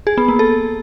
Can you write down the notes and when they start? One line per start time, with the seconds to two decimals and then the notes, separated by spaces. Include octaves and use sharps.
0.07 G#4
0.18 B3
0.28 A#3
0.39 A4